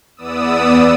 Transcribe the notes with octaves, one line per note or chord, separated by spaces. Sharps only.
E2 B3 D5 D#6 E6